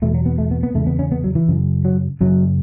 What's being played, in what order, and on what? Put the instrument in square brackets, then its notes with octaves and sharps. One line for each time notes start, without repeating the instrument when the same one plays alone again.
[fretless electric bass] E2 B2 A3
F#3
B3
A3
B3
B3
E2 C#3 A3
B3
C#4
B3
F#3
E3
F#2 C#3
F#3
F#2 C#3 F#3